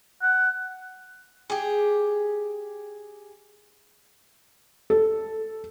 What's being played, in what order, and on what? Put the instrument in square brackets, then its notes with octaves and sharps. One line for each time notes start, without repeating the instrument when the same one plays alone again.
[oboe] F#5
[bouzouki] G4 G#4
[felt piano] A4